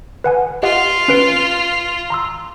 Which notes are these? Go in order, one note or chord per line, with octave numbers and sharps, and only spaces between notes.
B4 F#5 G#5
F4 G4 D#5 F#5
C#4 B4 D7
A#5 C6 E6